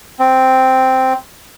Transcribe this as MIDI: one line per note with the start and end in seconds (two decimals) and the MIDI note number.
0.19 1.13 60